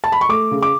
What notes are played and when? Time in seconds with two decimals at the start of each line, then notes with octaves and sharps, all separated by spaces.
0.04 A5
0.12 B5
0.21 C#6
0.29 A3 D6
0.51 C#3
0.62 D6